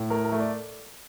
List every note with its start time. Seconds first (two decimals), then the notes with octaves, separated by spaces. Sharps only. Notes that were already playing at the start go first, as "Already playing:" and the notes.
Already playing: A2
0.10 A3 A#4
0.25 A#4
0.32 A3
0.40 D5